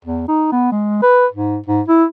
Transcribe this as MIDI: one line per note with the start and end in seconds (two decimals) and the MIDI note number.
0.05 0.25 40
0.28 0.48 63
0.52 0.70 59
0.72 0.99 56
1.02 1.26 71
1.32 1.59 44
1.66 1.82 44
1.88 2.04 64